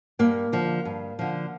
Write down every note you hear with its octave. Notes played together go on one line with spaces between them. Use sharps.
G2 A#3
D3 F3
G2
D3 F3